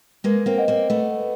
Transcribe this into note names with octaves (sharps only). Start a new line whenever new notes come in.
G#3 A#3 B4
A#3 C4
D#5 F#5
A#3 C4
A3 B3 B4